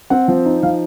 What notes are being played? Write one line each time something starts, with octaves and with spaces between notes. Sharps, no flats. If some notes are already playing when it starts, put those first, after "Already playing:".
C4 F#5
F3
D#4
F3 F5